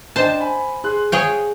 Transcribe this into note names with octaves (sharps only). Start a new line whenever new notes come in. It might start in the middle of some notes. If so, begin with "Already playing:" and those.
D4 C5 D#5 G5 A5
G#5 B5
G#4 C6 F#6
G#4 C#5 F5 G5 D#6